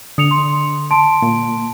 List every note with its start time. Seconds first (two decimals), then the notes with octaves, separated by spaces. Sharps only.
0.18 D3 D#6 C#7 F7
0.31 C6
0.91 A5 C6 D7
1.22 A#2